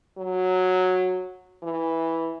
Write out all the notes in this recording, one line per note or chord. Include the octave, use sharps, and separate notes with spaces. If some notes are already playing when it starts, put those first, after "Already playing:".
F#3
E3